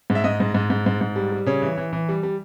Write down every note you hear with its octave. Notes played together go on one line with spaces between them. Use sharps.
G#2
E5
G#2 D#5
G#2
G#2
G#2
G#2
G#2
G3
G3
C#3 C#5
E3
E3
E3
G3
G3